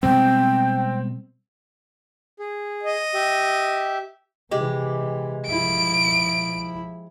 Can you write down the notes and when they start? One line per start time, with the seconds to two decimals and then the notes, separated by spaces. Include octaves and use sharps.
0.03 B2 G3 G#3 C4 G5
2.39 G#4
2.83 D#5
3.14 G4 E5
4.51 C3 E3 G#3 G4
5.47 F3 E4 D7